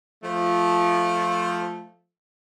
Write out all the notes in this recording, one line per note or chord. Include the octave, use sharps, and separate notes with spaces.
F3 A3